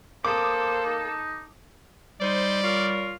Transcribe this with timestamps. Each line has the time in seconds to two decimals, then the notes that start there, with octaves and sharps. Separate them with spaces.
0.25 A#3 A4 C5 D6 D#6
0.85 D#4
2.21 G3 D#4 C5 D5
2.63 F4 A#4 C#5